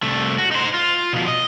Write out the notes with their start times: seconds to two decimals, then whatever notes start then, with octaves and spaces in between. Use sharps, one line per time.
0.02 C2 A3
0.38 F#4
0.51 D#4 C5
0.74 F4
1.13 B2 F3
1.28 D#5